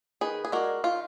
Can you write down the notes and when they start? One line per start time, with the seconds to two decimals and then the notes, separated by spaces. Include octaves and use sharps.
0.21 D#3 G#4 B4
0.45 G#4
0.52 G#3 D4 F#4 A#4
0.84 D#3 F4